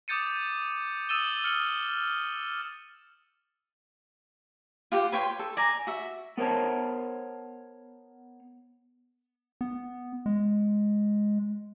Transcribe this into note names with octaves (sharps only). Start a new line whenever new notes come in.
D6 D#6 G6 A6 C#7 D#7
D#6 E6 A6 D#7 E7 G7
F6 C#7 F#7
F4 G4 F#5 G5
B4 C#5 G5 C6
A4
D5 G#5 A#5
F#4 E5
B3 A#4 C5 C#5 A5
B3
G#3